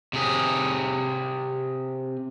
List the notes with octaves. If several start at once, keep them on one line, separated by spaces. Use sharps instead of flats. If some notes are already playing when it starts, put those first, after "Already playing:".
C3 G#4